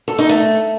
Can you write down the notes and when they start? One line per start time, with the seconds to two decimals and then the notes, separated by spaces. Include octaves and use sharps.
0.08 A4
0.19 D#4
0.29 A3